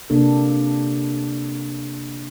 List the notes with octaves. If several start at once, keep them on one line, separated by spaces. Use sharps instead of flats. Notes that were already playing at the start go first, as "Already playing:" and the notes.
C3 A#3 D4 A4